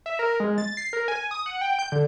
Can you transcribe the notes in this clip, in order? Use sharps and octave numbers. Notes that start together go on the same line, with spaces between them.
E5
A#4
G#3
A6
C7
A#4
G#5
D#6
F#5
G5
G6
D3